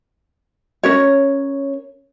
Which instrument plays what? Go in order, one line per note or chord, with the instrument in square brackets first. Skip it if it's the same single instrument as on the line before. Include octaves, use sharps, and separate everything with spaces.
[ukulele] C#4 A#4 C#5